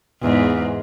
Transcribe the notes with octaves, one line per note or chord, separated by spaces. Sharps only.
E2 G#2